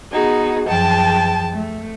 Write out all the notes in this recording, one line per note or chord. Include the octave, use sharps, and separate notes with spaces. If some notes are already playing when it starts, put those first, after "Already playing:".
B3 D#4 F#4 G#4
F#2 F3 G#4 G5 A5
A3